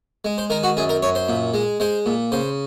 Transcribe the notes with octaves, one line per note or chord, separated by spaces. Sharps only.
G#3
C5
D#3 A#4
F#4
F#2 G#4
A#4
F#2 C#5
C5
A#2
G#3
G#3 C5
A#2
C#3 C5